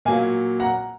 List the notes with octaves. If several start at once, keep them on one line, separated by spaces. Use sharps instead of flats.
A#2 F#3 F5 G#5
F#5 A#5